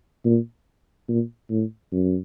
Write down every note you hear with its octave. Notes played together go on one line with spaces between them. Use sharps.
A#2
A#2
A2
F#2